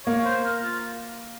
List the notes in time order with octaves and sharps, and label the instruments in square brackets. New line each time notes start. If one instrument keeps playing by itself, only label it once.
[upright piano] A#3 [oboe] C#5
[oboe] C5
A#4
F4